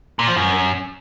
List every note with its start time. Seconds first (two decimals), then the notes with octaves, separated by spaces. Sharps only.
0.19 A#2
0.28 F3
0.36 F#2